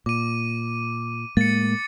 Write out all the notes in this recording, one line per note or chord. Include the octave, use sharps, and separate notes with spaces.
A#2 D6 D#7
A2 G#3 A#3 A6 C#7